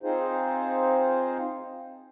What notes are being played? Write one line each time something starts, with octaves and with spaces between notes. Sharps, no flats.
C4 D#4 F4 G#4 C5